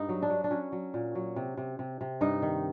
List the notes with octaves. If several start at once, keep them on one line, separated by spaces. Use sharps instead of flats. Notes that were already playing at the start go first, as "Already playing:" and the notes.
Already playing: G2 D#4
F#3
D4
F#3
D4
F#3 C#4
F#3
A#2
F#3
C3
C3
C3
C3
G2 D#4
D#3